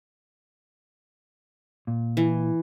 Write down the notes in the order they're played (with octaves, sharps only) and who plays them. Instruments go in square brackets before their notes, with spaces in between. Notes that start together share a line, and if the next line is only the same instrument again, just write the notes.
[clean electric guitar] A#2
[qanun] E3